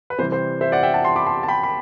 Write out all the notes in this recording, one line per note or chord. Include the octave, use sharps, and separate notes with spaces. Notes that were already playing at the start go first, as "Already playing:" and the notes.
B4
C3 E3 G3 C5
C5
C5 E5
D5 F#5
E5 G5
F#5 A5
A5 C6
B5 D6
A5 C6
A5
G5 B5
B5